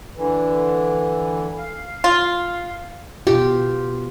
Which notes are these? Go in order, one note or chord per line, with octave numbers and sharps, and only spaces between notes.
D3 E3
F5
F4
B2 F4 G4